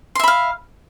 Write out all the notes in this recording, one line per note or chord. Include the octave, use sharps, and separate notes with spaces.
E5 F5 B5 C6